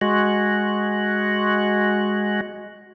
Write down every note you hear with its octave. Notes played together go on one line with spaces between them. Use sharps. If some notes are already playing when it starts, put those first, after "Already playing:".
G#3 F#4